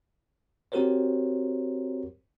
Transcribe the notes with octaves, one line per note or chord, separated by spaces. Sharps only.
C4 F#4 G4 A#4 C5 C#5